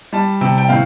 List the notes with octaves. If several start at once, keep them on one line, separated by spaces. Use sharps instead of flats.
G3 A5
C3 G5
G5
A2 F5